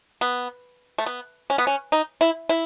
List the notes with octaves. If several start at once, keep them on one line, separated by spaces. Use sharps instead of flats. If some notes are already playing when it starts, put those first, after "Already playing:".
B3
A3
B3
C#4
B3
C#4
D#4
E4
E4